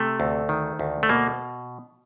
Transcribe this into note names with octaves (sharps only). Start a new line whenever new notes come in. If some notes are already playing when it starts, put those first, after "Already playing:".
Already playing: C3 A3
D2
D#3
D2
A3
B2 A#3